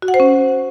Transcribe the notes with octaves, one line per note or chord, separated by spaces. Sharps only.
F#4
F#5
C5
C#4